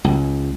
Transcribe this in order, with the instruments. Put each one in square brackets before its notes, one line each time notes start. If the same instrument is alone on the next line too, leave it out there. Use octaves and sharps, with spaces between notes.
[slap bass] C#2